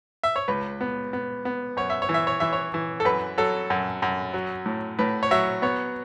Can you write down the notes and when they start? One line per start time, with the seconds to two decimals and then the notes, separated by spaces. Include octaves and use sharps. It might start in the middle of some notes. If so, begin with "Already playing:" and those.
0.23 E5
0.36 C#5
0.48 C#2 B4
0.81 B3
1.13 B3
1.45 B3
1.77 F#2 C#5
1.90 E5
2.02 C#5
2.09 E3
2.14 E5
2.27 C#5
2.40 E3 E5
2.53 C#5
2.74 E3
3.00 A4
3.05 F#2 B4
3.38 F#3 A4
3.70 F#2
4.02 F#2
4.34 F#3
4.66 A2
4.99 A2 B4
5.23 C#5
5.31 F#3 E5
5.62 B3 C#5